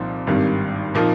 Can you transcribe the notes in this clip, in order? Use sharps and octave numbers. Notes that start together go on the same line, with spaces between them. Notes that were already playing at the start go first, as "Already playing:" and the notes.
Already playing: C2 A#2 F3 C4 D#4
G#1 G2 D#3 G3
A#2 F3 A#3 D#4